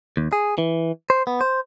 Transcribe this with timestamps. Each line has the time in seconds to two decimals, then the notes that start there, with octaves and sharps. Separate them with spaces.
0.17 D#2
0.33 G#4
0.58 E3
1.10 C5
1.27 B3
1.41 C5